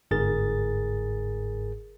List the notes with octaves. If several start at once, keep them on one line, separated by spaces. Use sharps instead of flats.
G1 G#2 G#4 A#4 A6